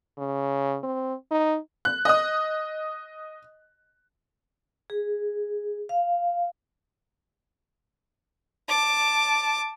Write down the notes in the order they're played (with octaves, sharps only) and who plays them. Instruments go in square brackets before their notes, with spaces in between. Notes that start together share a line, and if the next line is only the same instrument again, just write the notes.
[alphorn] C#3
C4
D#4
[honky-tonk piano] F#6
D#5 D#6
[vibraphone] G#4
F5
[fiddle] A5 D6